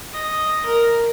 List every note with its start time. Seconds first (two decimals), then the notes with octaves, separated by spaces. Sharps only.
0.13 D#5
0.66 A#4